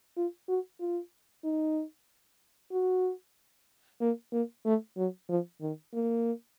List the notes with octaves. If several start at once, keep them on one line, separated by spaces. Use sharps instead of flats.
F4
F#4
F4
D#4
F#4
A#3
A#3
A3
F#3
F3
D#3
A#3